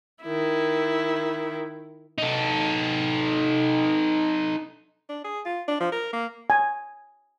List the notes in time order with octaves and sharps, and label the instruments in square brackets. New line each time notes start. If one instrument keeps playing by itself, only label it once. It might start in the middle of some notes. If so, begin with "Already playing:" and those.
[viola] D#3 E4
[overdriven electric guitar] D#4 A4
[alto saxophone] D4
G#4
F4
D4
F3
A#4
A#3
[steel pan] G#5